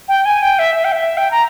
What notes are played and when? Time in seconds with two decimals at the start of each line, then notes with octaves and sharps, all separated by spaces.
0.08 G5
0.25 G#5
0.42 G5
0.59 E5
0.75 E5
0.84 G5
0.92 E5
1.17 G5
1.31 A#5